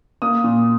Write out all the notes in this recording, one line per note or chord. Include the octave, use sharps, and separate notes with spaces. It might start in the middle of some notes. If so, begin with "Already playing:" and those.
A#3 D#6
A#2